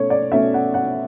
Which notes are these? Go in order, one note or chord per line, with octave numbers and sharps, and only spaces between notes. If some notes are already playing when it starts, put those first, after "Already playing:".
Already playing: B2 A3 C#4 C#5
D5
B2 A3 C#4 E5
F#5
F#5